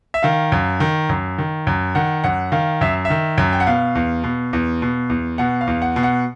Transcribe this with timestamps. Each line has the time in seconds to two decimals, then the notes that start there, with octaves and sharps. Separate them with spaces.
0.14 E5
0.23 D#3 F5
0.52 F#2
0.80 D#3
1.09 F#2
1.38 D#3
1.67 F#2
1.95 D#3 F#5
2.24 F#2 F#5
2.52 D#3 F5
2.81 F#2 E5
3.05 E5
3.10 D#3
3.38 F#2
3.53 G5
3.60 F#5
3.67 B2 F5
3.95 E2
4.24 B2
4.53 E2
4.82 B2
5.10 E2
5.38 B2 F#5
5.61 F5
5.67 E2
5.82 F#5
5.96 B2
6.03 F#5